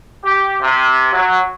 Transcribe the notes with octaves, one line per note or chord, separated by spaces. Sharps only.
G4
C3
F#3